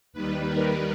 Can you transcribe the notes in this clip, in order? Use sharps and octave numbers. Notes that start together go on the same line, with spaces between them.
D#2 D#3 G3 B4
A#4